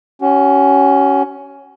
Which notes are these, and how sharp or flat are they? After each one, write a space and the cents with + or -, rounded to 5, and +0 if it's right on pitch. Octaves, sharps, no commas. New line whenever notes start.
C#4 +10 F#4 +40